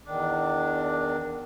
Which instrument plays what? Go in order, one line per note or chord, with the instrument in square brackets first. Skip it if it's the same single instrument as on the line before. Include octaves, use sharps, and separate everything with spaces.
[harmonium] E2 D#3 D4